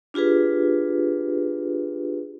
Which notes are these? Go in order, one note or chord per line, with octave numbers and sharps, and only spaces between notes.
D4 F4 G4 G#4 B4